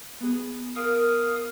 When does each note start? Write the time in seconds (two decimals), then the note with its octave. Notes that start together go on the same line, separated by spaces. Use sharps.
0.20 B3 G#4
0.76 A#4 F5 D#6